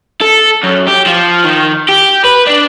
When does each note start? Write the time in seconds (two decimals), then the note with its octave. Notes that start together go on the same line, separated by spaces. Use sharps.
0.21 A4
0.63 F#2
0.87 G4
1.06 F3
1.44 D#3
1.88 G4
2.24 B4
2.47 D4